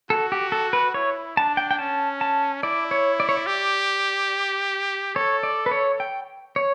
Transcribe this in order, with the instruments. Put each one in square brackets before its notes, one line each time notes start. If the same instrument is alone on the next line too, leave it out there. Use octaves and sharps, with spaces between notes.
[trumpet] F#4 [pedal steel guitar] A4
[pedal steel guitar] G4
A4
B4
[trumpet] E4 [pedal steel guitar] C#5
[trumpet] D4 [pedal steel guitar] A5
[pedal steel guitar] G5
G5
[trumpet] C#4 [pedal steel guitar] A5
[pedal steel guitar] A5
[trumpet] E4 [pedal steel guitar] D5
[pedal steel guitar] C#5
D5
C#5
D5
[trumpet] G4
[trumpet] A4 [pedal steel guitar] C#5
[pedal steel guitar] D5
B4
C#5
G5
C#5